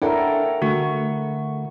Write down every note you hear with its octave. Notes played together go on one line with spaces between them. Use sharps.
D4 E4 A4 A#4 C#5 F#5 G5
D3 A3 F#4 F#5 C#6